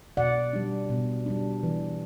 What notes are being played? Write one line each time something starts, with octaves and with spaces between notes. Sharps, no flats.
B2 D5 F#5
G3 D4
B2
G3 D4
E3